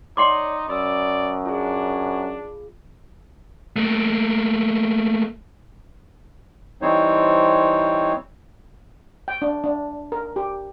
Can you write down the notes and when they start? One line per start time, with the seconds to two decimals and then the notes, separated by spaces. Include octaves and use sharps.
0.17 D#4 C#5 D5 F#5 C6 D6 C#7
0.69 F#2 D5 B5 D#6 E6
1.45 D4 F4 G#4
3.76 A3 A#3
6.82 E3 G3 C4 D#4 C5 C#5
9.28 G5
9.42 D4
9.64 D4
10.12 A#4
10.36 G4